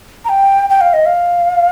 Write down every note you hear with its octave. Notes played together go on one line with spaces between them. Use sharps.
A#5
G5
G5
F5
D#5
F5